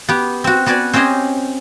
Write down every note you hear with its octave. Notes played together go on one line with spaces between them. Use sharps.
B3 G4
C4 F#4
B3 F#4 B4 D5 G#5
C4 C#4 G4 C5 D#5 G#5